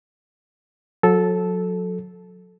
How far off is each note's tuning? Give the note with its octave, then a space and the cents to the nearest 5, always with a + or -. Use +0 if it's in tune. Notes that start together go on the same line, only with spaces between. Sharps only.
F#3 -35 A4 -10